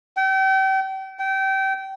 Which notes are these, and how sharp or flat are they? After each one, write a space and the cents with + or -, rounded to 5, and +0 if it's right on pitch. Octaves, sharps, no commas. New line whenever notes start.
G5 -35
G5 -25